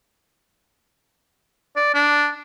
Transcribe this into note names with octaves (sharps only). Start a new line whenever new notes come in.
D5
D4